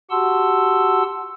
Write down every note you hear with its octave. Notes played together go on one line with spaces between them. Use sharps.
F#4 G4 F#5 A5 C6 E6